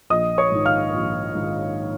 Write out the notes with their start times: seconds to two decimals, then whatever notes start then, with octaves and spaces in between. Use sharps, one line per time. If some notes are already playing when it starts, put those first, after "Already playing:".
0.10 A#1 D#5 D#6
0.38 C#5 C#6
0.52 G#2 D#3
0.65 F5 F6
0.94 A#1
1.35 G#2 D#3